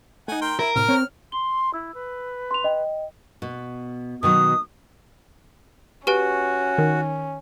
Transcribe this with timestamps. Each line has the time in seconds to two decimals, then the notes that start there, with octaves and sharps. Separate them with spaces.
0.28 A3 D#4 F#5 G#5
0.42 A#4 G5 C6
0.59 E4 A#4
0.76 A2 C3 F6
0.89 C4 C#5
1.32 C6 G7
1.74 E4 E6
1.94 B4
2.51 C6 F7
2.64 D#5 G5
3.42 B2
4.23 B2 D#3 F#3 D#6
6.07 C#4 F#4 G4 B4 G#5
6.78 D#3